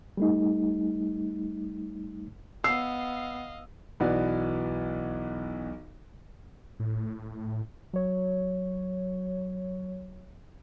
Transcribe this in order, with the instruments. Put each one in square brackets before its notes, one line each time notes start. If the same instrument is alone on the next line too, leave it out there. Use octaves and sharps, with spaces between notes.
[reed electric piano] G3 A3 D#4
[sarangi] B3 [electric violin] D#5 F5 [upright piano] E6 [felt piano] C7
[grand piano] B1 E3 B3 F#4 D5
[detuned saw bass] A2
[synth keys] F#3 C#5